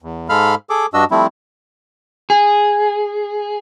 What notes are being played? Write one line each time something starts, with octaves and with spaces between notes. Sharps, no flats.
E2
G#2 G#3 A4 F5 B5 F6
G#4 A4 D6
G2 D4 F#4 D#5 E6
F3 G3 A3 C4 E4
G#4